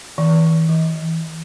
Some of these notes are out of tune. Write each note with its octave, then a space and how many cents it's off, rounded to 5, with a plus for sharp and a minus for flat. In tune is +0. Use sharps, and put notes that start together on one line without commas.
E3 -30
E3 +5